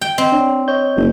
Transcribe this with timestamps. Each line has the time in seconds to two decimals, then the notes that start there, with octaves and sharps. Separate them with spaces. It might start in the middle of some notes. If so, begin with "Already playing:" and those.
0.01 G5
0.18 C4 D#5
0.32 D4 C#5
0.68 C#5 D#5 G6
0.96 F#1